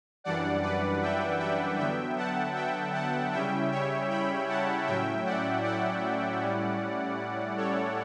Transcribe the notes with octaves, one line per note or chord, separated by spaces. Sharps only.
F#2 E3 G3 D4 D5 F#5
B4 D5
E5 G5
E5 G5
D3 F#3 B3 E5 G5
F#5 A5
E5 G5
F#5 A5
C#3 G3 C#4 E4 E5 G5
C#5 E5
G5 B5
F#5 A5
A2 F#3 C#4 E4 E5 G5
D5 F#5
D5 F#5
A2 G3 C#4 E4
A4 C#5